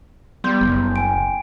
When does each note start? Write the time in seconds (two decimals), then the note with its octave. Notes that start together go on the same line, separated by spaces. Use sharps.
0.44 G3 B3 C6 G6
0.61 F#1
0.96 G5 G#5 D7